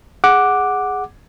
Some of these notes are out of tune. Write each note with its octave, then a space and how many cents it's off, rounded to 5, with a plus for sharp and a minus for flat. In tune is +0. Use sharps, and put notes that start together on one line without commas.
G#4 -5 F#5 +0 D6 +0